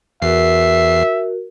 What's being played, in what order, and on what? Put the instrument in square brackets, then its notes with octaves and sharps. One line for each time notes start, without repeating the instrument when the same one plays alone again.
[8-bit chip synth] E2 C7 [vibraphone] F#4 A#4 [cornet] E5